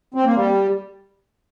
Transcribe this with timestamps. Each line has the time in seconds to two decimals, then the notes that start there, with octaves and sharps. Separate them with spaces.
0.14 C4
0.25 A#3
0.35 G3